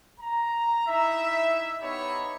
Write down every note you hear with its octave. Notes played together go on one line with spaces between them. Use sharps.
A#5
D#4 E4 E5
B3 D#4 G4 C#5 B5